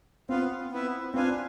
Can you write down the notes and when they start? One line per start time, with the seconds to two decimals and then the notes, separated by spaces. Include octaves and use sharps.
0.29 B3 C4 F4 B4 F5
0.72 B3 E4 B4 E5
1.14 C4 D4 F4 B4 F5 G#5